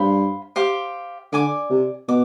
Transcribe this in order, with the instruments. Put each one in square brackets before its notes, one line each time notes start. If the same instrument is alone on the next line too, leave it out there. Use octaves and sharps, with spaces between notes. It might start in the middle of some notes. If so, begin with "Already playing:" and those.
Already playing: [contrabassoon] G2 [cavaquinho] C5 F5 B5
[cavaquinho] G4 C5 F5
[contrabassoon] D3 [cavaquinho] D5 G#5 D6
[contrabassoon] C3
[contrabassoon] B2 [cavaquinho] D6